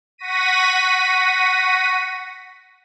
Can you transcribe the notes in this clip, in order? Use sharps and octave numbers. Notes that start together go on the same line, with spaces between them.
F#5 C#6 A#6 B6 D#7